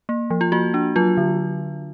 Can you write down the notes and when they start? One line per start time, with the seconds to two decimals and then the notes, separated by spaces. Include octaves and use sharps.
0.09 A#3
0.30 F3
0.41 F4
0.52 A#3 F#4
0.74 D4
0.96 F#3 F4
1.17 D3